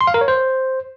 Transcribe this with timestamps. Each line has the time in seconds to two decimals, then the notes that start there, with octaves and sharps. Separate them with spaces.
0.01 C6
0.07 F5
0.14 A#4
0.21 C#5
0.28 C5